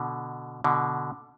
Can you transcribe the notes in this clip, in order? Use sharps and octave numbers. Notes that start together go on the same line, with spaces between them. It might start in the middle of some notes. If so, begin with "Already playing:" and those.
Already playing: B2 D3
B2 D3